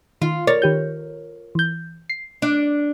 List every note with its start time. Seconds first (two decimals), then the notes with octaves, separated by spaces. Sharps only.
0.22 D#3 F4
0.47 A#4 C#5 D5 A6
0.62 D#3 G4 G6
1.55 E3 G6
2.10 C7
2.42 D4